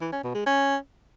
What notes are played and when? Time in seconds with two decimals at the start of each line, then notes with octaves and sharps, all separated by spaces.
0.01 E3
0.12 C#4
0.24 B2
0.35 G#3
0.46 C#4